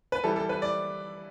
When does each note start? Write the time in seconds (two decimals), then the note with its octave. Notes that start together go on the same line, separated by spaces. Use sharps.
0.12 B4
0.24 E3 G3 E4 A4
0.36 A4
0.49 B4
0.62 D5